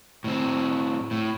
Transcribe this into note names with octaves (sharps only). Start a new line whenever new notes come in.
A2 C4
A2